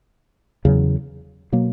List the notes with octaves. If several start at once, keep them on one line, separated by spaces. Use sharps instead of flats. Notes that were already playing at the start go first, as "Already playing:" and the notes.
E2 C#3 F#3
B2 F#3 A#3